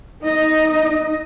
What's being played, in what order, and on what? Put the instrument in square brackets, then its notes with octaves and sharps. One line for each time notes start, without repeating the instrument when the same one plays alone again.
[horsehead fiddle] D#4 D#5